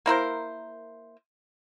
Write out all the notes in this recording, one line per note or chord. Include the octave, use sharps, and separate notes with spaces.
A#3 E4 A#4 C5